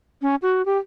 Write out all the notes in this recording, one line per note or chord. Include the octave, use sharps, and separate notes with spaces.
C#4
F#4
G4